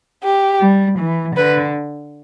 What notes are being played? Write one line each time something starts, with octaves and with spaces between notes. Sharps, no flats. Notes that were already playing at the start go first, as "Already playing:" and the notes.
G4
G3
E3
D3 B4